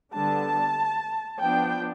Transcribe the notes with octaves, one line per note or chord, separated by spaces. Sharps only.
D3 G3 B3 D4 A5
F3 B3 D4 G5